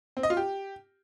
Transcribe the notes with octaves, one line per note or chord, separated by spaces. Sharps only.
C4
D#5
F4
G4